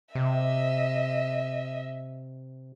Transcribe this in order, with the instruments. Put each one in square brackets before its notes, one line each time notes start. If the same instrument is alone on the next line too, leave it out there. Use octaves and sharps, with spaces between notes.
[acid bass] C3 [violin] D#5 E5